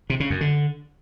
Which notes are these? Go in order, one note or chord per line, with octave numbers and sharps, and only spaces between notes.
C3
C#3
F#2
D3